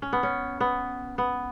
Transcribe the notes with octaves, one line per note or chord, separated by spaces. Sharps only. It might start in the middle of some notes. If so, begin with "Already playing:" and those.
C#4
B3
C#4
B3
B3